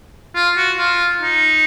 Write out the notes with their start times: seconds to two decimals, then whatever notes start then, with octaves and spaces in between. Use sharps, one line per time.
0.35 F4
0.57 F#4
0.78 F4
1.21 D#4